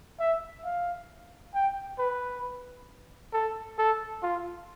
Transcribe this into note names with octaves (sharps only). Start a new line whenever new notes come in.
E5
F5
G5
B4
A4
A4
F4